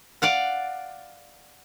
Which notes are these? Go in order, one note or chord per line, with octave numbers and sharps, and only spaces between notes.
D5 F5 F#5